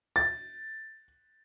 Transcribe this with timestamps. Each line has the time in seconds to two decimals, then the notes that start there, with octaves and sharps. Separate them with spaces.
0.16 A6